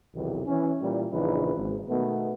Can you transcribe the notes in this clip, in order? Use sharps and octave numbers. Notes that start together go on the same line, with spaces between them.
B1 E2 C3 D#3
E3 C#4
A#2 E3 G3
A#1 C#3 E3 D#4 B4
G#1
B2 D#3 A3 B3